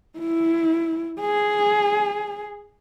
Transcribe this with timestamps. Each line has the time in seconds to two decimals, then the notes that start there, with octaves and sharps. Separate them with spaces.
0.19 E4
1.21 G#4